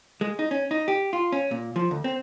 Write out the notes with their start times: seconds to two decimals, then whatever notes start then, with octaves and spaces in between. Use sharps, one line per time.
0.21 G#3
0.39 D#4
0.51 C#4
0.71 D#4
0.88 G4
1.13 F4
1.32 C#4
1.51 A#2
1.76 F3
1.91 D2
2.04 C4